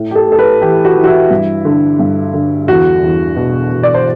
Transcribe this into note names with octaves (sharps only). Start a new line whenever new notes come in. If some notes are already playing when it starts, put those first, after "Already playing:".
Already playing: A2
G4
A4
A2 A4
B4
E3 G4
F#4
E3
F#4
E4
G2
D3
G2
D3
E2 F#4
E2
B2
B2
D5
C5